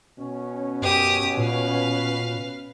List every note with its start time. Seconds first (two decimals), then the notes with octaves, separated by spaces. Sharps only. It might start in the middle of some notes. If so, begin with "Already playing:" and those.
0.18 B2 C#4
0.82 F#2 G4 D#6
1.37 A#2 B4 F5